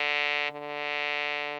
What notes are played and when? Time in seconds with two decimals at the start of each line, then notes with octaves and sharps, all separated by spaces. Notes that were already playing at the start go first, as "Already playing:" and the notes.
Already playing: D3
0.51 D3